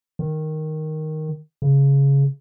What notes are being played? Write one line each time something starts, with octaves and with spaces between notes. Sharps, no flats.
D#3
C#3